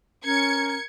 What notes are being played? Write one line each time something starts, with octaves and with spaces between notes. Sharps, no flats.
C#4 A#4 G#6 C#7